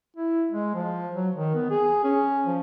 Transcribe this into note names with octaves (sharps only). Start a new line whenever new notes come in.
E4
G#3
F3
F#3
D#3
B3
G#4
C#4
F3